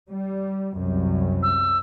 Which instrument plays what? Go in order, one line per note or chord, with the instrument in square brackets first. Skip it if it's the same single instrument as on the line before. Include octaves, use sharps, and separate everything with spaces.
[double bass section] G3
C2 F#2
[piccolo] E6